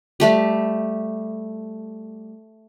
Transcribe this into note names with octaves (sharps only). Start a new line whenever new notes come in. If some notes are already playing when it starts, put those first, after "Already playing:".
G3 A3 G4